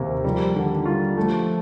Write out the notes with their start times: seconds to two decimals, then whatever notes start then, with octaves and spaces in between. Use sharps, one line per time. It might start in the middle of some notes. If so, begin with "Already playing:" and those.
Already playing: D#2 C3 D#3 A#3
0.24 F3 G3
0.56 D3 D#3
0.86 G3 F4
1.17 F3 A3